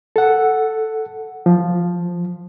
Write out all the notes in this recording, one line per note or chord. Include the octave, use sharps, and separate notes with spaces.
A4 F#5
F3